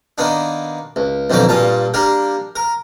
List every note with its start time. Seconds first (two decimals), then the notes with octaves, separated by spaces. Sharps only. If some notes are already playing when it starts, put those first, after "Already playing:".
0.18 D#3 A#3 B3 D4
0.96 C#2
1.30 B1 F2 D3 D#3 A#3 D6
1.49 G2 A#2 F4 A5
1.94 G3 A#3 D4 A#4
2.56 A#4